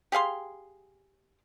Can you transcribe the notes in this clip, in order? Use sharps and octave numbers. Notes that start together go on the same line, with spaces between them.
G4 G#4 F5 C6